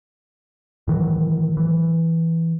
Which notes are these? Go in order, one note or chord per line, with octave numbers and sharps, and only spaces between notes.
A2 D#3 E3 F#3
E3